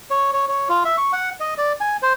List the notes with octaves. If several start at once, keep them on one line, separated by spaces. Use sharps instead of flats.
C#5
C#5
C#5
F4
E5
C#6
F#5
D#5
D5
G#5
C5